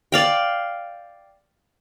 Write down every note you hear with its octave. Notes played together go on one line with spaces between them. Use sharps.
D5 F5 G5